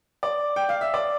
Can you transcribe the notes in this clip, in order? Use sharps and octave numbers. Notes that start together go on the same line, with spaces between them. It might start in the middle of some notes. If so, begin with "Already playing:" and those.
D5
G5
F5
E5
D5